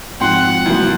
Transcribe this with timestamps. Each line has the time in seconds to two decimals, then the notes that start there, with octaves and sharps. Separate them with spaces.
0.21 G#1 F3 F#5 G5 C6 F#6
0.66 C2 E3 F#3 A#3